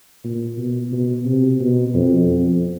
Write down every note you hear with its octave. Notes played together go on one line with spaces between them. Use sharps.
A#2
B2
B2
C3
B2
F2
F2